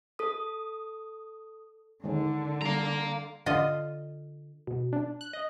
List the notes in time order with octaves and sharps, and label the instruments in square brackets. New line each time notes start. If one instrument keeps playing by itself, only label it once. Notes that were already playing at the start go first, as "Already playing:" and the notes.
[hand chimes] A4 D#6
[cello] D3 [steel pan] D#3 G#3
[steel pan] G3 [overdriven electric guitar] F5 A#5
[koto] D3 F4 D#5
[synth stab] B2
D4
F#6
D#5